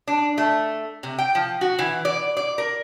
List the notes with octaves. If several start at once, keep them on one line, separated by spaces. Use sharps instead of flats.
D4
A3
C3
G5
F3
F#4
E3
D5
D5
A#4